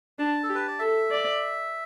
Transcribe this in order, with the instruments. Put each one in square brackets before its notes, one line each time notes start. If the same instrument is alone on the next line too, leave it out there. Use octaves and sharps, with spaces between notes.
[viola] D4 [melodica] A5
[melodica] A4
[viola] G4
[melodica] B4
D5
[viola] A4 [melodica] E5
[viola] D5